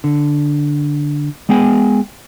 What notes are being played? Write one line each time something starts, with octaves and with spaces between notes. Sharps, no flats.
D3
G#3 B3 G#4 G5 G#5